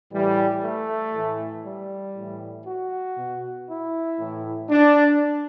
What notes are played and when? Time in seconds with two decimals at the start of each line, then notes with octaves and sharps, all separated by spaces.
0.13 A2 E3 G3
0.63 A3
1.14 A2 E3
1.65 G3
2.16 A2 E3
2.66 F#4
3.18 B2
3.69 E4
4.19 A2 E3
4.70 D4